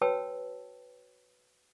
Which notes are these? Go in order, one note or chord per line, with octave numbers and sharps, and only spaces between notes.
F#4 B4 C#5 G5 A5 E6